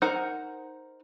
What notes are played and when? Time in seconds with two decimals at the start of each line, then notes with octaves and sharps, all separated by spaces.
0.02 D#4 A#4 C5 F#5